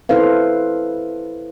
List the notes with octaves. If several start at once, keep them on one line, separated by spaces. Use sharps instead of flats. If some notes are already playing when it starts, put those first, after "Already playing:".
E4 A4 B4 C5 F5